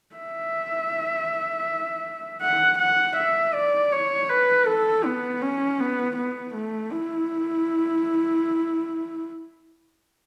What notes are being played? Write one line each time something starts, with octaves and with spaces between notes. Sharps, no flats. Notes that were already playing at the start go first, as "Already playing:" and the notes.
E5
F#5
F#5
E5
D5
C#5
B4
A4
B3
C#4
B3
B3
A3
E4